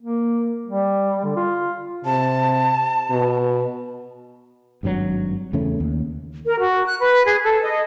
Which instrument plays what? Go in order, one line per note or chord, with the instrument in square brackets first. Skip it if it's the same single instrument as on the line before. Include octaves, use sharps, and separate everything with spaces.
[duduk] A#3
G3
D3
F4
[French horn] C3 [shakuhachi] A5
[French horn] B2
[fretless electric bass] G#1 G2 C3 F#3
E2 C#3 A3 C#4
D#2
[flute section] A#4
F#4
F#6
B4
G#4
A4
D#5